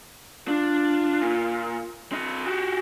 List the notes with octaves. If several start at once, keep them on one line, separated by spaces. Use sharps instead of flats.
D4 F4
A#2
C4 D#5
F#4 G4